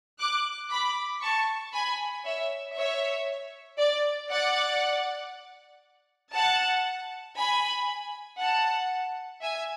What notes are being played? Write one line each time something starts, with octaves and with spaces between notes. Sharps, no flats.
D6 F#6
B5 D6
A5 C#6
G#5 B5
C#5 E5
C#5 E5
D5
D5 F#5
F#5 A5
G#5 B5
F#5 A5
E5 G#5